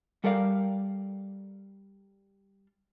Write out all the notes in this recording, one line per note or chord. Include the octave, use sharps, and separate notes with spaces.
G3 A4 A#4 D5 F5